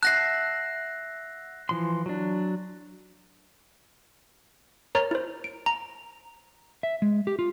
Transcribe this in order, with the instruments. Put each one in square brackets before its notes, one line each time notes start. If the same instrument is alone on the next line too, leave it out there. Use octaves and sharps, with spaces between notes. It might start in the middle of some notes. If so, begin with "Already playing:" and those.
[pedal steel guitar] E5 F#5 A5 [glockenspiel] F#6 A#6 C7
[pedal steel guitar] E3 F3 C6
F#3 D4
[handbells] A#4 C#5 A#5 F6 A6
E4 C5
D7
A#5
[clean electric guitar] E5
G#3
G4
F4